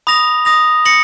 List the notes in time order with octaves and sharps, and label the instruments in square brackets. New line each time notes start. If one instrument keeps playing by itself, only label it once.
[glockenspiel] B5 D#6 A#6 F7
B5 D#6 A#6 F7
D#6 A#6 C#7 F#7